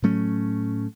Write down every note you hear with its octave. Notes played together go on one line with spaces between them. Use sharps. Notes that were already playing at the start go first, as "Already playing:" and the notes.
A2 F#3 A3 C#4